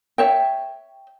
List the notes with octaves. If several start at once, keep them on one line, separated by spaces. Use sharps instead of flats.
C#5 E5 G5